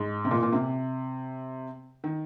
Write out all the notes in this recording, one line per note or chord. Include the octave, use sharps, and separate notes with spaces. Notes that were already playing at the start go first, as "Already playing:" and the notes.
Already playing: G#2
C3
A#2
A#2
C3
D#3